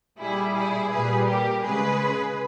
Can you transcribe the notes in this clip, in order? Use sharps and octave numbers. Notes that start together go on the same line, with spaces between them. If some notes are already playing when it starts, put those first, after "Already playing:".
A#2 G3 E4 G#4
E4 G#4
A#2 G3 G#4 B4
G4 A#4
C#3 G#3 G#4 B4